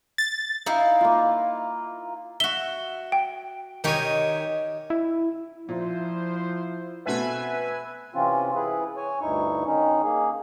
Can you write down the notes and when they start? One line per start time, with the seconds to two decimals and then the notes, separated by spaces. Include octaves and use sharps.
0.18 A6
0.66 D#4 E4 F5
1.01 A#3 F4
2.40 F#4 E5 G7
3.12 G5
3.84 D#3 D#4 G4 C#5 G#5
4.90 E4
5.69 A#2 F3 E4 C5
7.06 B2 A3 C4 B4 E5 G#5
8.15 C3 E3 C4 C#4 F4
8.55 E4 G#4 B4
8.97 C#5 G#5
9.21 D2 G2 D#4 E4 C#6
9.66 D#3 C#4 D#4
10.03 A#3 G#4